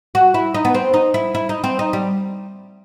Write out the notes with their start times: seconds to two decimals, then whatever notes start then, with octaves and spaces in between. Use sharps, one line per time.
0.15 F#4
0.34 E4
0.54 D#4
0.65 B3
0.75 C4
0.94 D#4
1.14 E4
1.35 E4
1.49 D#4
1.64 C4
1.79 D#4
1.93 G3